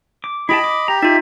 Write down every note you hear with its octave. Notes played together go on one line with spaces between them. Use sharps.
D6
E4 G4 D#5 A5 B5
D6
G4 A#5
D#4 F4 E5